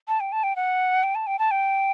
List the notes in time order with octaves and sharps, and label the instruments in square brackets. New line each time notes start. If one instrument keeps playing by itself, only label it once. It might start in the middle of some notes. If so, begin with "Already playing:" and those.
[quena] A5
G5
A5
G5
F#5
G5
A5
G5
A5
G5